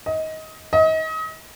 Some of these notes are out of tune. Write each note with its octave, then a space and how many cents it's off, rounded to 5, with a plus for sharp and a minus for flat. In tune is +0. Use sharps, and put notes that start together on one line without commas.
D#5 +25
D#5 +35